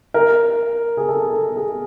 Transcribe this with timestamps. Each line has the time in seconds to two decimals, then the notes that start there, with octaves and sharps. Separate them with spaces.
0.14 A#4
0.97 G#4
1.09 A4
1.33 A4
1.56 G#4